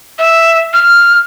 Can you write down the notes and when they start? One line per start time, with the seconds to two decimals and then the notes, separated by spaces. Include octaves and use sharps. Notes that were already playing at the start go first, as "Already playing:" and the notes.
0.19 E5
0.73 F6